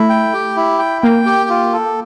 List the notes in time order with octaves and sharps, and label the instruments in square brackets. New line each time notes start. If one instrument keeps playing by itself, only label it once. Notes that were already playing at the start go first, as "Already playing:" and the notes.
Already playing: [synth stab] A3 [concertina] E4
[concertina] G5
G4
E4
G5
[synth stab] A#3 [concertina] G5
[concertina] G4
F4
A4